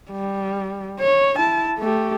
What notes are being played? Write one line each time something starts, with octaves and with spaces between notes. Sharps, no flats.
G3
C#5
E4 A5
A3 G4